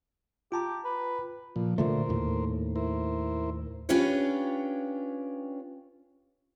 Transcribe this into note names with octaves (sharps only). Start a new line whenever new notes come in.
F4 G4 A5 A#5
B4
A#2 F3
A#2 D3 A3 A#4 C5
D#2 A2
E4 A#4 C5
C#4 D4 F4 G4 B4 C#5